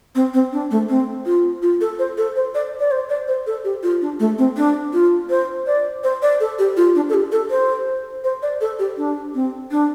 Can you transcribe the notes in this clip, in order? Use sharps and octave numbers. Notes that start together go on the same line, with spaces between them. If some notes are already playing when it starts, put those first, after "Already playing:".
C4
C4
D4
A3
C4
F4
F4
A4
C5
A4
C5
D5
D5
C5
D5
C5
A4
G4
F4
D4
A3
C4
D4
F4
C5
D5
C5
D5
A4
G4
F4
D4
A4
G4
A4
C5
C5
D5
A4
G4
D4
C4
D4